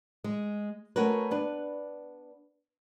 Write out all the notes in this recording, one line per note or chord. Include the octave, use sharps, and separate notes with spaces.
G#3
A3 C#4 F#4 A#4 B4
B3 D4 B4